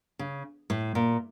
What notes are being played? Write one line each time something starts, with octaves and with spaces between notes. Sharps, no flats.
C#3
A2
A#2